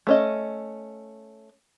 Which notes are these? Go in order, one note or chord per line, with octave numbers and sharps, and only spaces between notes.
A3 C#4 D#5